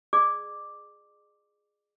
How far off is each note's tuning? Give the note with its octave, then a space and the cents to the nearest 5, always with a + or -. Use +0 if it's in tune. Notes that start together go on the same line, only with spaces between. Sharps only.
G#4 +0 D5 +45 D6 +0